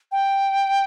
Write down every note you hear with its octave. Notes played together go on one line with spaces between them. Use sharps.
G5